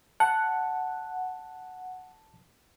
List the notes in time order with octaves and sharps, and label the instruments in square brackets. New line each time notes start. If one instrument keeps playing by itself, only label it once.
[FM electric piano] F#5 [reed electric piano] A5